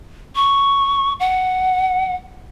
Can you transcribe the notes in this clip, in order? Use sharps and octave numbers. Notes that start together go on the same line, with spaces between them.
C#6
F#5